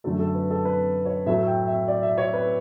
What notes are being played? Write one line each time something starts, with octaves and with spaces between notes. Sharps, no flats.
F#2 D3 A3 A4
A4
B4
A4
B4
C#5
A2 F#3 A3 E5
G5
E5
D5
E5
C#5
B4